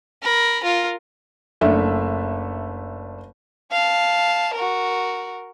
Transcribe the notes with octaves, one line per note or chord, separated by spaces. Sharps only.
A#4 B5
F4 A#4
F#1 A3 D4 E5
F5 A5
F#4 A#4